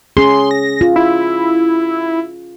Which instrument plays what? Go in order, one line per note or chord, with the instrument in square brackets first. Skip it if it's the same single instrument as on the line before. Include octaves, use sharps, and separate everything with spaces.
[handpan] C#4 G#4 [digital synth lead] C6
[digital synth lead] A#6
[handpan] F4
[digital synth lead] E4